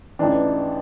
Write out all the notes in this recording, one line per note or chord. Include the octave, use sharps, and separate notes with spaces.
A1 G#2 E3 D4